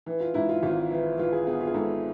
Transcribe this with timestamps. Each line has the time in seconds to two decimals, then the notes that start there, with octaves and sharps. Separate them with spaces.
0.06 E3
0.20 F4
0.34 G#2 E4
0.49 F4
0.63 G#1 F4
0.91 E3
1.18 E3 F4
1.33 G#4
1.47 B3 G#4
1.61 F4
1.67 G#4
1.74 G#2 A4